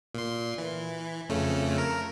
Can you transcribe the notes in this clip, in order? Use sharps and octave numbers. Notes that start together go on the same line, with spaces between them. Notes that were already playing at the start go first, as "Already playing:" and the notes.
A#2 C6
E3
F2 C#3 A3
A#4